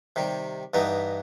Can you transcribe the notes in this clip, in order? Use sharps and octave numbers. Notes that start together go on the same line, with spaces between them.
C3 D#3 G3
G2 E3 B3 D#4